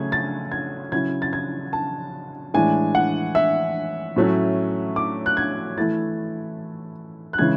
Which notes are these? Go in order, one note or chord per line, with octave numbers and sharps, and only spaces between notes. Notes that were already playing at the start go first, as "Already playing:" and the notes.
Already playing: C#3 F#3 A3 C#4 G#6
A6
G#6
C#3 F#3 C#4 E4 G#6
A6
G#6
A5
A2 E3 G#3 D4 G#5
F#5
E5
A2 F#3 A3 C#4
D6
F#6
G#6
E3 A3 E4 A6
F#6
C#3 E3 G#3 G#6